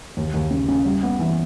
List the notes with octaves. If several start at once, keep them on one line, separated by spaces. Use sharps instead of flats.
D#2
D#2
C#3
C#3
G3
B3
E3